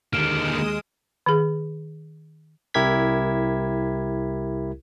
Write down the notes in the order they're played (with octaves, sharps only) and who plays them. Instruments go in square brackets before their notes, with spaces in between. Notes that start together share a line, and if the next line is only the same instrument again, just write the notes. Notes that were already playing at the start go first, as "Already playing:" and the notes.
[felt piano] D#2 [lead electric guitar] D3 A#3 [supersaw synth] G#3 D#6 [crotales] F6 D7 E7
[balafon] D#3 G#4
[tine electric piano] C2 E4 G4 A#4 G#6 B6